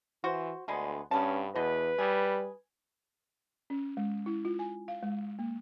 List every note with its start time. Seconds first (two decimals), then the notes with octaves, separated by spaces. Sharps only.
0.24 E3 F#4 C5
0.68 D2 D3 G#3 B3
1.11 G2 C#3 B3 C#4 A5
1.55 E2 B2 B4 D#5
1.98 G3 G#4
3.70 C#4
3.97 G#3
4.26 E4
4.45 F4
4.59 G#5
4.88 F5
5.03 G#3
5.39 A#3